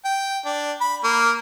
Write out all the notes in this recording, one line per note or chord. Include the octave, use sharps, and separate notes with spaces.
G5
D4
B5
A#3